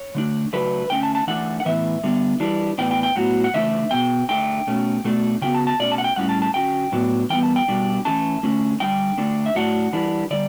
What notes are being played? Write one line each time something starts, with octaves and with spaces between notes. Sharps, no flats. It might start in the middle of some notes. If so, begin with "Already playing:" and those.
Already playing: C#5
D3 A3 D4
C#3 F#3 A3 D4 B4
D3 A3 C#4 G5
A5
A5
E3 A3 D4 F#5
F#5
A2 E3 B3 E5
D3 G3 B3
E3 G3 D4
A2 E3 B3 D4 G5
G5
G5
A2 F#3 B3 F#5
F#5
C#3 E3 A3 D4 E5
B2 G3 B3 G5
D3 A3 D4 G5
B2 A3 C#4
B2 A3 D4
C#3 F#3 B3 G5
A5
A5
B2 A3 C#4 D5
A5
F#5
G5
A2 G3 C#4 F#5
A5
A5
D3 F#3 C#4 G5
A2 F#3 B3 D4
E3 G3 B3 G5
A5
G5
B2 G3 D4
E3 A3 C#4 A5
D3 A3 C#4
D3 G3 D4 G5
D3 A3 D4
E5
A2 F#3 A3 D4 F#5
E3 G3 D4
D3 G3 D5